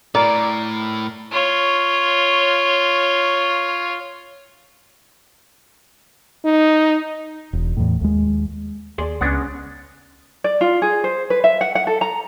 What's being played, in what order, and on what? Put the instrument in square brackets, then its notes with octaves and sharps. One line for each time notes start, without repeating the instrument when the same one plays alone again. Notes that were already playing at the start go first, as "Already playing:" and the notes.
[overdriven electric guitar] A2 [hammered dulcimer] A#4 [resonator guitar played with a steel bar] D5
[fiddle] F4 C#5
[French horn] D#4
[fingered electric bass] E1
E2 A2
D#2 G#3
[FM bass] D#2 [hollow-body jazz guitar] G#4 D5 C6
[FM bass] C#2 [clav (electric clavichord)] G#3 B3 D4 [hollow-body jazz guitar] C#4 C#5 F#5
[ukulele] D5
F4
G#4
C5
B4
E5
F#5
F#5
A4
A#5